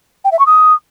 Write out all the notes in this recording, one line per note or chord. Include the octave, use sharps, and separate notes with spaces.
G5
E5
C#6
D#6